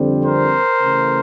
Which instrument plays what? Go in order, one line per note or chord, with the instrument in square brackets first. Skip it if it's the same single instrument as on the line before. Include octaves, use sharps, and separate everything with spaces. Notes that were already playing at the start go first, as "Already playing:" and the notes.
Already playing: [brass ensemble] F2 D3 G3 C4
A#4 C5
C#3 E3 A3